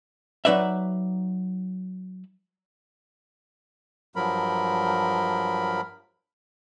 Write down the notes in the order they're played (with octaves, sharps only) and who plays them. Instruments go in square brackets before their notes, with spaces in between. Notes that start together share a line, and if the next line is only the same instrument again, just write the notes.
[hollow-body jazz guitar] F#3 D#4 B4 D5 E5
[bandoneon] G2 F3 F#3 A#4 B5